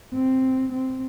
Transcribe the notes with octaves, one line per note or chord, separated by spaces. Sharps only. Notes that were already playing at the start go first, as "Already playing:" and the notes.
C4
C4